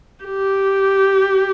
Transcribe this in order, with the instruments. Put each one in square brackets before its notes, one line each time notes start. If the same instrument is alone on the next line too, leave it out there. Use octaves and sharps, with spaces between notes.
[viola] G4